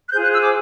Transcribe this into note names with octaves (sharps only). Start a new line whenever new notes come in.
F#6
F4 G#4 C5 G6
F#6
E6
D6